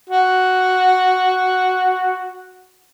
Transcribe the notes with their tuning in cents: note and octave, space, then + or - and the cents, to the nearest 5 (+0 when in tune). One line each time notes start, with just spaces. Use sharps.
F#4 +0